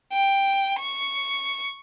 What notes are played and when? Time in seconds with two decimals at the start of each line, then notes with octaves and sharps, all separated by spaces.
0.12 G5
0.79 C#6